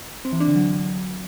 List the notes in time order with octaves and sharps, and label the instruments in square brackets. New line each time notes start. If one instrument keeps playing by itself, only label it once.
[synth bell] C4
E3
D4
D3
F#3